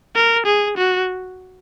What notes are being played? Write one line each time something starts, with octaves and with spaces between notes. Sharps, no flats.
A#4
G#4
F#4